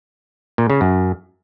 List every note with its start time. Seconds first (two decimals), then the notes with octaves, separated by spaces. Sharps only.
0.58 A#2
0.70 C#3
0.81 F#2